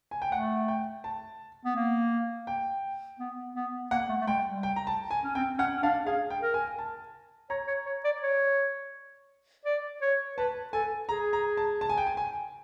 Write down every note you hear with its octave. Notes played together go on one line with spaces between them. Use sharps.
G#5
G5
A3 F#5
G5
A5
B3
A#3
G5
B3
B3
A#3 F#5
A3
A3
G#3 G5
G3
G5
A#5
A5
G#5
C#4
C4 G5
C#4 F#5
C#4
D4 F5
G#4 F5
G5
A#4
G#5
A5
C#5 A#5
C#5
C#5
D5
C#5
D5
C#5
B4 A5
A4 G#5
G#4 A#5
A#5
A5
A5
G#5
G5
G#5
G#5